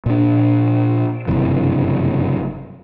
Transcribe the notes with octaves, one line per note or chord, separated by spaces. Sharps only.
A#2 D4
F#1 G2 C3 E3